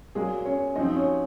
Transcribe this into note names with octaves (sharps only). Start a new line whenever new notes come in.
A#2 F#3 G#3 A#3 G#4
C#4 C#5
F#2 F3 C4 D#4 D#5
C#4 C#5